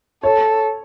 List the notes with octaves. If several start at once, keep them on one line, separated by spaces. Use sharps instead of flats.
A4 C#5